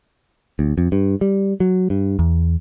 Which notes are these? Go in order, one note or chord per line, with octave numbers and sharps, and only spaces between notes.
D2
F2
G2
G3
F#3
G2
E2